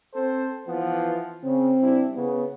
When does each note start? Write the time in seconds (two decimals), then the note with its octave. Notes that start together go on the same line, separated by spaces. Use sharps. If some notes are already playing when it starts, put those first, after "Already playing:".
0.14 C4 A4 C5
0.67 E3 F3 B3
1.44 C#3 C4
1.81 G3 D4 E4
2.16 C#3 B3